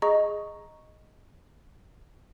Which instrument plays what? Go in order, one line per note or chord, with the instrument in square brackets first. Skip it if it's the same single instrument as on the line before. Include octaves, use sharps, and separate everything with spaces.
[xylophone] G#4 D#5 A#5 C#6